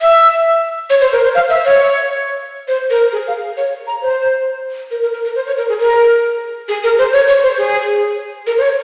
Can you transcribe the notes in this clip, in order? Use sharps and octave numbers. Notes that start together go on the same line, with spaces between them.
E5
C#5
C5
A#4
C5
F5
E5
C#5
C5
A#4
G#4
F5
C#5
A#5
C5
A#4
A#4
A#4
A#4
C5
C#5
A#4
G#4
A#4
G#4
A#4
C5
C#5
C#5
C5
G#4
A#4
C5
C#5